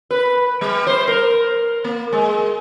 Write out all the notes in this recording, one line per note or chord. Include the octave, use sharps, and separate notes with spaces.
B4
G3
C5
A#4
A#3
G#3